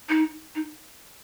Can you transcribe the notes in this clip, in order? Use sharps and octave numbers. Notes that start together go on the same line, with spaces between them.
D#4
D#4